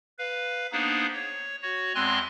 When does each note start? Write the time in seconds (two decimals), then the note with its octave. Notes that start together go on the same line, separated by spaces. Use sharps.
0.18 B4 F5
0.72 A#3 B3 D4 D#4 G#4 C5
1.14 C#5
1.62 F#4 C#5
1.95 E2 G#3 C4 G#5 C6 F#6